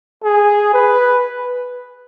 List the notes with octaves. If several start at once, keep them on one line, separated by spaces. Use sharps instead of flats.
G#4
B4